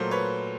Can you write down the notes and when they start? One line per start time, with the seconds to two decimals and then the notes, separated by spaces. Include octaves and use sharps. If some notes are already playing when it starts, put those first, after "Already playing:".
Already playing: A#2 F#3 A3 A#4 C5
0.11 B4 C#5